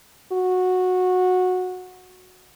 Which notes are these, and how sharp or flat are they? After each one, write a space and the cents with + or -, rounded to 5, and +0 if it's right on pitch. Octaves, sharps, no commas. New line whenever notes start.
F#4 -15